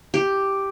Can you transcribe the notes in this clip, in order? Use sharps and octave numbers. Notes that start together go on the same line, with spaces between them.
G4